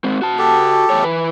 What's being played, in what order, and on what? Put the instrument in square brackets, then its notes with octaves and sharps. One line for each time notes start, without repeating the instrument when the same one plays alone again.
[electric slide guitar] G#3 C4
F#4 A5
[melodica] G4 A4
[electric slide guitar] E2 A3 C#5
E3 B4